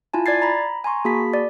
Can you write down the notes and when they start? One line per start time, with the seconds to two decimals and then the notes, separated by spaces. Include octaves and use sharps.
0.14 E4 F4 G#5 A5
0.26 D5 G#6 A6 C7
0.42 A#5 B5
0.84 G#5 A#5 C6 C#6
1.05 A#3 F#4 G#4 A5 B5 B6
1.33 D5